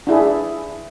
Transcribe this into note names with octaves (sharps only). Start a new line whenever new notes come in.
D4 E4 G#4